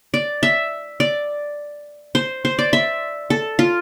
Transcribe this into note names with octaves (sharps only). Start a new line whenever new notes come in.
D5
E5
D5
C5
C5
D5
E5
A4
F4